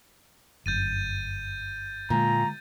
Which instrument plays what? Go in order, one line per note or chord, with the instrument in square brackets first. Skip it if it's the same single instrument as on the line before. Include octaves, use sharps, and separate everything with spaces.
[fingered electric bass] G1 F#2 [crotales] G6 A6 D#7
[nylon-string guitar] A#2 [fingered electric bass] D3 G#3 [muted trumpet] A#5